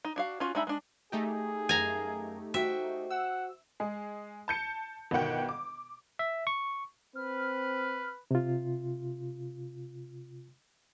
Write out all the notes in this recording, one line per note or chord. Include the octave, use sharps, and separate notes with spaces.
D#4
D4 F#4 F5
C#4 F4 F#4
G#3 D4 D#4 E5 B5
G#3 D4
A3 D#4 G4 G#4
F#2 A#4 F5 G#5 A#5
F#4 C5 E5 G5
F#5 E6
G#3 G#4
A5 G6 C#7
G1 B2 D#3 F#5 G5
D6
E5
C#6
C4 B4 F6
C3 F4